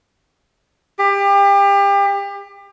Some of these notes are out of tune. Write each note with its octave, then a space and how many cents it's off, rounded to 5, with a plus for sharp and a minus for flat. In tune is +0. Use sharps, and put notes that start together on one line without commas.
G4 +30